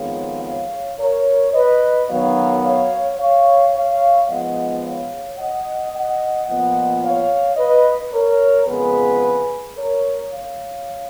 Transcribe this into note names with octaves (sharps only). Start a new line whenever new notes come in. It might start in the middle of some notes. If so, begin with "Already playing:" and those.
Already playing: F2 D#3 G#3 B3 C#5 F5
C#5 F5
A#4 C#5
B4 D#5
F#2 D#3 F#3 B3 C#5 F5
C#5 F5
C#5 F5
C#5 F5
G#2 F3 G#3 B3 D#5 F#5
C#5 F5
D#5 F#5
D#5 F#5
A#2 F3 B3 D#5 F#5
C#5 F5
B4 D#5
A#4 C#5
F2 C#3 G#3 B3 G#4 B4
A#4 C#5
C#5 F5